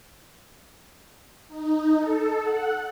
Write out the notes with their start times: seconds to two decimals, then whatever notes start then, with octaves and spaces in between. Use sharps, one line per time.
1.48 D#4
1.97 A4
2.41 F#5